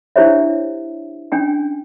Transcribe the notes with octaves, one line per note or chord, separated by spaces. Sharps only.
D4 E4 G4 C5 C#5 E5
C#4 D4 G5 G#5